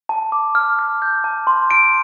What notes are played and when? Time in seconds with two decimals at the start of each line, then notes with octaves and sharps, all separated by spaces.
0.09 A5
0.32 D6
0.55 F6
0.79 F6
1.02 G6
1.24 A5
1.47 C6
1.71 D7